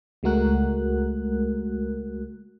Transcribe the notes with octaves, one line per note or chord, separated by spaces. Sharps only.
C#2 G#3 A3 F#4 A#4 F#6